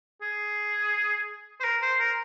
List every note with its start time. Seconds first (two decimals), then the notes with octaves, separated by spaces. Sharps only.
0.22 G#4
1.60 C5
1.64 A#4
1.82 C5
2.00 A#4